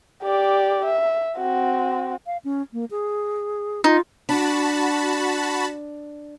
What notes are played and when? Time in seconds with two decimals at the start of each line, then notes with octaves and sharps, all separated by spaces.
0.23 G4 D5
0.84 E5
1.37 C4 F#4
2.26 F5
2.44 C#4
2.73 A#3
2.91 G#4
3.84 D#4 F4
4.29 D4 F#4 A5 B5